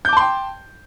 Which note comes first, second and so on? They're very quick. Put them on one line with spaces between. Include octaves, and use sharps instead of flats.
G6 D6 A5 C6 G5